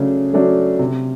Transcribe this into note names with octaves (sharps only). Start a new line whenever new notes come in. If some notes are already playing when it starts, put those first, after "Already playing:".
Already playing: C#3 F#3 A3 D4
F#3 A3 D4
C3